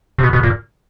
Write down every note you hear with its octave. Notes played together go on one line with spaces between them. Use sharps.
C3
B2
B2
A#2